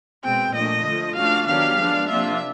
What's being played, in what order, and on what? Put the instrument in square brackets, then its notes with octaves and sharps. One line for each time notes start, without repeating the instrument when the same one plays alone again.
[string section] B2 G#3 C4 [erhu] G5
[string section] A#2 F3 A3 D4 [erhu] D#5
[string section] D3 F3 A3
[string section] C#3 F3 A3 D4 F#4 [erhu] F5
[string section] D#3 F#3 B3 D4 G4 [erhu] F5
[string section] F3 G#3 B3 D4
[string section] C3 F3 A#3 D4 F4 [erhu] E5